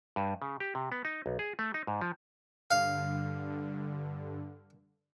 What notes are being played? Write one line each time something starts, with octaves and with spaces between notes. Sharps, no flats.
G2
C#3
G4
C3
B3
D#4
B1
G#4
A3
D#4
G#2
F3
G2 D3 F5